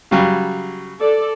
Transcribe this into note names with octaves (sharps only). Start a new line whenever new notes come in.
C#3 F#3 G3
A4 D5